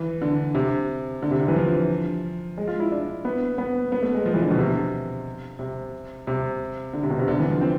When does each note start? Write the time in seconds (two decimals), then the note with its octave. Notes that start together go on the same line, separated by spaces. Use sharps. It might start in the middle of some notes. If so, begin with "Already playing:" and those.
Already playing: E3
0.22 D3
0.55 C3
1.22 D3
1.31 C3
1.40 D3
1.48 E3
1.56 F3
2.58 G#3
2.68 F4
2.80 E4
2.91 D4
3.25 B3
3.58 B3
3.92 B3
4.02 A3
4.14 G#3
4.26 F3
4.34 E3
4.42 D3
4.51 B2
4.59 C3
5.59 C3
6.27 C3
6.93 D3
7.03 C3
7.10 B2
7.19 C3
7.28 D3
7.39 E3
7.50 F3
7.61 C4